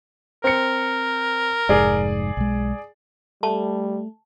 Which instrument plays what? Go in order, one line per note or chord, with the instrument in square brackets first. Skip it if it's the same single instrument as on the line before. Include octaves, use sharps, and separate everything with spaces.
[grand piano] C4 C#7 [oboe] A#4
[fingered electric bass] F1 G#2 [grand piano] G#4 D5
[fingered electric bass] B1 G#3
[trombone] G3 [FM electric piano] A3 [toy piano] A5